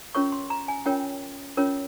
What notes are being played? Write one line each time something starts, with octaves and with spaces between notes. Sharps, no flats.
C#4 F4 A#4 C#5 C#6
C6
A#5
G#5
C#4 F4 A#4 C#5 G5
C#4 F4 A#4 C#5